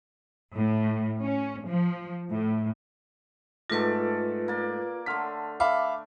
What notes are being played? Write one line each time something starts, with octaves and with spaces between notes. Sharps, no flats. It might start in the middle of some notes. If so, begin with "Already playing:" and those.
A2
C#4
F3
A2
G#2 A3 F4 A4 B4 D5 A#6
A#3 D5
D3 A3 C6 F6 B6
E5 F5 B5 D6